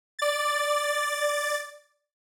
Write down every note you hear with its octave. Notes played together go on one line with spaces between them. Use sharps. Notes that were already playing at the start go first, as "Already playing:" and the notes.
D5 A6